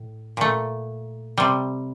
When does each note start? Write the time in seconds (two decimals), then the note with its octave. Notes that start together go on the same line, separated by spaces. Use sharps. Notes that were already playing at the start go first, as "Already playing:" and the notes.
Already playing: A2
0.37 A#2 A3
1.38 C3 G3